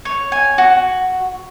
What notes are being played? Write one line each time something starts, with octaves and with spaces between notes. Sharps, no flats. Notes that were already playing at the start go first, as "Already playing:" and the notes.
C#5
G#5
F#4